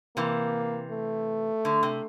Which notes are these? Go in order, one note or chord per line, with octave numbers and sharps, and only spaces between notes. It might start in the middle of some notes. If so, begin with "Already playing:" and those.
C3 E3 A#3
A3
D3
C3